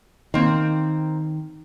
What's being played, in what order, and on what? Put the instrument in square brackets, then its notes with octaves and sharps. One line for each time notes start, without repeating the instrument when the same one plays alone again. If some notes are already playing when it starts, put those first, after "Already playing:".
[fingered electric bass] D#3 [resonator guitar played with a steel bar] A#3 C4